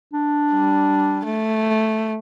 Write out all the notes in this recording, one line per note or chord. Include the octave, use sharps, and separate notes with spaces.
D4
G3
A3